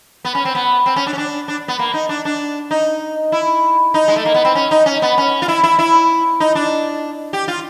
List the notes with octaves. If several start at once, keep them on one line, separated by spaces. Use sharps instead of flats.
B3
C#4
C4
B3
C4
C#4
D4
C#4
D4
D4
B3
A#3
D#4
D4
D4
D#4
E4
D#4
G#3
A3
A#3
B3
C4
C#4
D#4
C#4
B3
C#4
F4
E4
E4
E4
D#4
D4
G4
F4